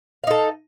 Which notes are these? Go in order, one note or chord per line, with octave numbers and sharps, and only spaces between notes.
D#4 A4 F5